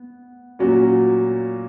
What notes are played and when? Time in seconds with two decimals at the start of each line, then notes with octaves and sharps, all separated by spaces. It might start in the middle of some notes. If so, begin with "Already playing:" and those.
Already playing: B3
0.59 A#2 F#3 C#4 F#4